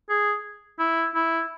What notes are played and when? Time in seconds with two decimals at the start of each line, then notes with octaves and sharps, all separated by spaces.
0.09 G#4
0.79 E4
1.15 E4